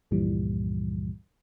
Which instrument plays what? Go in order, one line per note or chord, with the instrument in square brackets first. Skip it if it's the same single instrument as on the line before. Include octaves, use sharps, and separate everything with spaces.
[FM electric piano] C#2 G2 A#2 E3 F3 G3